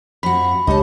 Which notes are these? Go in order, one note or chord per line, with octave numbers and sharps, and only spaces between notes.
F2 F#4 B5 B6
C#2 G#3 D4 G4 C#5 D#5 A5